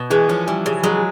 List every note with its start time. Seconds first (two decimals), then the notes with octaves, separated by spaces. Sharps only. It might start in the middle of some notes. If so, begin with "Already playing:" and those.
Already playing: B2
0.10 E3 G#3
0.28 F3 C#4
0.47 E3 G3
0.66 C#3 G3
0.83 F#3 G#3